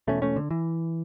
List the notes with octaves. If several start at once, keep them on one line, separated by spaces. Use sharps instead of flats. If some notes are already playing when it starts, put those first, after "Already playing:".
E1 E2 B2 A3 C#4
A3 C#4
D3
E3